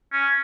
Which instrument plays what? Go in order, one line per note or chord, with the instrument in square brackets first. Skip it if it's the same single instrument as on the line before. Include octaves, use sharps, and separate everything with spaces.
[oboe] C#4